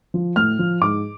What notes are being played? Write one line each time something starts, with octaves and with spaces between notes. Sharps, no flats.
F3
A2 F6
F3
G#2 D6